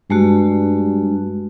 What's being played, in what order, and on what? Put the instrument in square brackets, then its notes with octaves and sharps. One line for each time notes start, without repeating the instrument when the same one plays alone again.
[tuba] G2 [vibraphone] G#3 A3 F#4